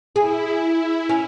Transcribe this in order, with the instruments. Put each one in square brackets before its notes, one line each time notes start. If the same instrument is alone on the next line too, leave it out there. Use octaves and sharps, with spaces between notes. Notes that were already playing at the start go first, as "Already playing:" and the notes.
[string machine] E4 [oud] G#4
[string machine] E4
[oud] C#4